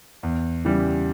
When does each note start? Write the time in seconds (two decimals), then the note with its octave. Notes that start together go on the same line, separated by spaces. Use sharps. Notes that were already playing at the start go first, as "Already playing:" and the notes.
0.23 E2
0.65 C#3 E3 G3